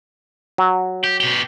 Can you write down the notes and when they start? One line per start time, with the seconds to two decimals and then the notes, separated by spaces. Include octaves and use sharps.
0.58 F#3
1.04 G4
1.20 B2 G4